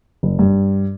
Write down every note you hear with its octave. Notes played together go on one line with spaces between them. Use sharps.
F#1
G2